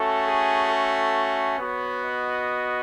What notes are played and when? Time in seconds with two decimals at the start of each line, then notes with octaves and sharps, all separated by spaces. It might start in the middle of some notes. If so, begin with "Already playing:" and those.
Already playing: A3 C#4 F#4 A4
0.26 G#4
0.71 A4
1.59 B3 F#4 C#5
2.04 D#5